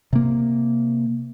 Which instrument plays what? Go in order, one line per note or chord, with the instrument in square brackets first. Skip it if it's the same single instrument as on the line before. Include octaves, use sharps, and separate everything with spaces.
[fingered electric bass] C3 A#3